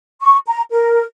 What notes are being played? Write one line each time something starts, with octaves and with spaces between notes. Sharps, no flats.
C#6
A#5
A#4